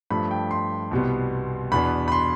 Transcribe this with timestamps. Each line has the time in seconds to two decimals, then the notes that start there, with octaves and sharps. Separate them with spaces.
0.10 G2 F3 A3 B5
0.31 G5
0.51 C6
0.91 C2 B2 G3 B3
1.72 E2 B2 B3 D4 B5
2.08 B5
2.12 C6